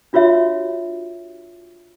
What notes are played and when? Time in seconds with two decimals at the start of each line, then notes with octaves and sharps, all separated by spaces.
0.13 D4 F4 F#4 C#5 E5